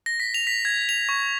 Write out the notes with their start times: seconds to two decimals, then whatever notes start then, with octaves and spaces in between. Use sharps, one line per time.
0.06 A#6
0.20 B6
0.34 F7
0.47 B6
0.65 G#6
0.89 F7
1.09 C#6